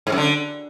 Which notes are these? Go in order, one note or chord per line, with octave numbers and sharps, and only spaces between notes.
G#2
F#2
D3